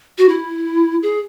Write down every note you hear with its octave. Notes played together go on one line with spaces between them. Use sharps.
F#4
E4
G#4